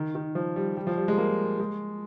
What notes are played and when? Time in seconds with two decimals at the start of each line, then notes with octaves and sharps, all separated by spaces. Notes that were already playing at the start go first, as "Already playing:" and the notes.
Already playing: D#3
0.15 D#3
0.35 F3
0.56 G3
0.77 G3
0.87 F3
0.98 G3
1.08 G#3
1.18 A#3
1.60 G#3